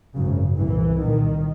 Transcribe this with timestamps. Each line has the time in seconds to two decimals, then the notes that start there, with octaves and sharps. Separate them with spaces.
0.14 G#1 F#2 C#3
0.57 C2 A#2 E3
1.00 C2 A#2 D#3